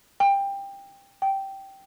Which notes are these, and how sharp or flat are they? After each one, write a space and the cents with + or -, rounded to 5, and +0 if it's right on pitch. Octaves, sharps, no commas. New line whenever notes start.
G5 +20
G5 -10